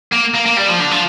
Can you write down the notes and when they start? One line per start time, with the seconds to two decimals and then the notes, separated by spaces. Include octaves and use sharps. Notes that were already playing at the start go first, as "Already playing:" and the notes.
0.12 A#3
0.34 A#3
0.46 A#3
0.57 G3
0.68 F3
0.80 D3
0.91 F3